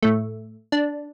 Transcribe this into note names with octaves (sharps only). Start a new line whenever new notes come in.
A2 A3
D4